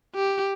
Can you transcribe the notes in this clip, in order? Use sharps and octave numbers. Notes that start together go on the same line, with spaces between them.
G4